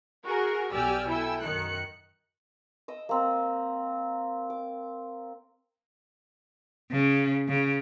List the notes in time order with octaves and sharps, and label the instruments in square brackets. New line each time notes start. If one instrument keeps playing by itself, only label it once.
[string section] F#4 G#4 A#4
B1 G4 D5 G#5 E6 F6
E4 A4 G5 G#5 E6
F#2 D#3 F#6 C#7
[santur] D#5 D6 E6
A#3 C4
D6
[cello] C#3
C#3